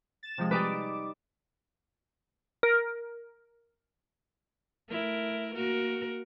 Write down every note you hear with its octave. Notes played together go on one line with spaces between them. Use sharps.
A6 E7
C3 F3 G#3
G3 D#4 B4 D6
A#4
A3 E4 A#4
A#3 F#4 A#4